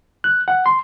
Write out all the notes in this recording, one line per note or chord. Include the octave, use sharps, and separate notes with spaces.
F#6
F#5
C6